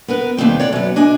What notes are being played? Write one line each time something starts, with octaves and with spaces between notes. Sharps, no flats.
B3 A#4 B4
D#2 G3 C4 G5
C#5 D5 F#5
F#2 B3
D4 D#5 G#5